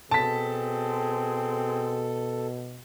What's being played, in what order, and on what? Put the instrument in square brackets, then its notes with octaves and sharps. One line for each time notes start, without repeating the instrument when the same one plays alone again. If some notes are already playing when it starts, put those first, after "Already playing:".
[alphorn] B2 [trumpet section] C4 G#4 [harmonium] A4 [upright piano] A5 B6